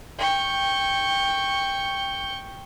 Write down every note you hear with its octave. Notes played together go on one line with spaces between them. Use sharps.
G5 C#6